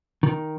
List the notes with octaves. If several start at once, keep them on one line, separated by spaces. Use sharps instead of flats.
D#3